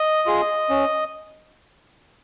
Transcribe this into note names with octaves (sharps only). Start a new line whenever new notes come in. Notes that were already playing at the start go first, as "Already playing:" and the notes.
Already playing: D#5
F4 G#4
C#4